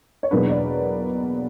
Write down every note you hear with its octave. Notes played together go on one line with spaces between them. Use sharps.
C#5
E2 B2 F#3 A#3 D4 B4
D5